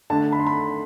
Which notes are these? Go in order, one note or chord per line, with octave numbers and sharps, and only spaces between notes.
D3 A3 D4 A5
B5
C6
B5